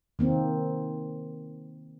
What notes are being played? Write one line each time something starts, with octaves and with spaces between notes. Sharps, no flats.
D#3 A#3 C4